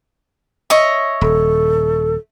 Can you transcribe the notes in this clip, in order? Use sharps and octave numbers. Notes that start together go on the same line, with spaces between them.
C#5 D#5 E5
D#1 A4